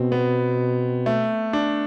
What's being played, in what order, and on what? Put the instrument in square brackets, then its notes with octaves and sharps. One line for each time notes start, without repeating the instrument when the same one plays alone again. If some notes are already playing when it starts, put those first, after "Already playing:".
Already playing: [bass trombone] B2 [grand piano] C4
[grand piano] B3
A3
D4